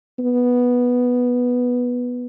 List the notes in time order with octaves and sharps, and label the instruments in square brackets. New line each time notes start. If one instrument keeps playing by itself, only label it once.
[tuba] B3